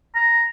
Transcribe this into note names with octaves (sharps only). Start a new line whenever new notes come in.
A#5